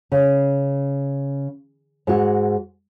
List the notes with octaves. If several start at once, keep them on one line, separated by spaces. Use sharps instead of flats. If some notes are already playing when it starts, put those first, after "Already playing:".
C#3
G#2 F#4